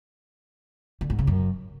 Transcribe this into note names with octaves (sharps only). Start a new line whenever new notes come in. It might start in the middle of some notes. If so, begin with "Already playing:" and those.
D3
G#2
C#3
F#2